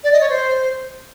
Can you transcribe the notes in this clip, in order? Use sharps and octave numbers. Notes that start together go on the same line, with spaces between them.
D5
D#5
C#5
C5